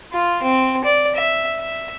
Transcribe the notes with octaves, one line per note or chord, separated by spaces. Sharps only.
F4
C4
D5
E5
E5